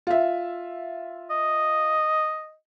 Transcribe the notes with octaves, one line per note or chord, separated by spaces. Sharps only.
F4 E5
D#5